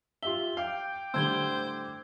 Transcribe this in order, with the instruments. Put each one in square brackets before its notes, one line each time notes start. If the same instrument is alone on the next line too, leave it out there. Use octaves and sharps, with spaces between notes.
[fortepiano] F4 G4 E5 [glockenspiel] G7
[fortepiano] F5 [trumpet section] G5 D6
[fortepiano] A2 D3 G3 [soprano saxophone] C5 [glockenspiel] E6 G#6 G7